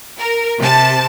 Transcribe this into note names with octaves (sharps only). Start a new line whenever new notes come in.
A#4
C3 A5